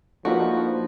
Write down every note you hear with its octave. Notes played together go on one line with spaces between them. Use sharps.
F3 A#3 D4 D#4 F4 F#4 A4 B4